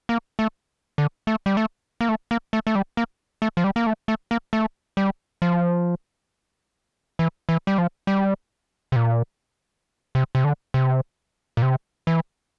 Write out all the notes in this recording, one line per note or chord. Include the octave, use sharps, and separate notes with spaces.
A#3
A3
D3
A3
G3
A3
A#3
A3
A#3
A3
A3
G3
A#3
A3
F3
G3
A#3
A3
A3
A#3
A3
G3
F3
E3
E3
G3
F3
G3
C3
A#2
C3
C3
D3
C3
A#2
C3
E3